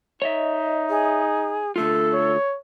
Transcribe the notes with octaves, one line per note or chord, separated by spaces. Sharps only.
D#4 C#5 D#5 E5
G#4
D3 A3 F4 A4
C#5